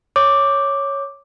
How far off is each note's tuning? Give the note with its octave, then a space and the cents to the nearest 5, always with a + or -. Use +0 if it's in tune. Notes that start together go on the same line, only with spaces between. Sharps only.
C#5 +0 D6 +0